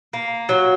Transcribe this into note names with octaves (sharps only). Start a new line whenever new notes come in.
A#3
F#3